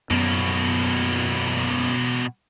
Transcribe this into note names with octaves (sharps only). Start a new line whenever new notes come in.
F#2 B2 A#3 B3